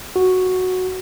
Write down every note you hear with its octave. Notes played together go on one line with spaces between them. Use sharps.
F#4